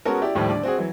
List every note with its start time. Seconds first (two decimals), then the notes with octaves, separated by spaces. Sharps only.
0.05 G#3 B3 C#4 F#4 A4 A#4
0.22 E4 G4 D5
0.35 D#2 A2 D#3 F3 G3
0.50 D3 D5
0.63 C4 F#4 G#4
0.78 E3 F#3